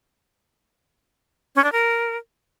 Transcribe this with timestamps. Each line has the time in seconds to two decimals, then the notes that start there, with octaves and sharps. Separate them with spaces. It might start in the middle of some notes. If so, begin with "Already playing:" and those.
1.56 C#4
1.64 D4
1.72 A#4